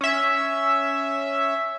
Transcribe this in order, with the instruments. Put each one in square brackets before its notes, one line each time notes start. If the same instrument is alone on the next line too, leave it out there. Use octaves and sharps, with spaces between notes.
[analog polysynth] C#4 E5